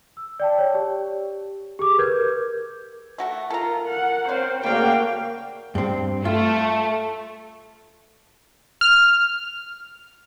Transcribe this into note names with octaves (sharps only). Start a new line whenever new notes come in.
E6
D5 G5 A5
C#5 D5
G4
G4 G#4 D6
A#4 B4 G6 G#6
A3 F#4 A4
F4 A4 A#4 A#5
F#5
C4 C5 C#5 F5
C#3 G3 A3 A#3 F#4 D5 F5 G5
G2 C4
A3 F4
F6